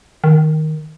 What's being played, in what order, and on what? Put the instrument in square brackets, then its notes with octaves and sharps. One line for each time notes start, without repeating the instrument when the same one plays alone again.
[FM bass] D#3